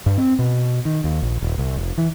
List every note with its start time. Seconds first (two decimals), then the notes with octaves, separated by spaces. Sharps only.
0.06 G2
0.18 C4
0.39 B2
0.85 D#3
1.04 D#2
1.22 A#1
1.42 D#1
1.58 C2
1.77 F1
1.98 E3